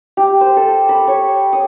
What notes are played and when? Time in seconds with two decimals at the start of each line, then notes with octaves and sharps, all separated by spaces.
0.17 G4
0.41 C5
0.57 A4
0.89 B5
1.08 C#5
1.53 D#6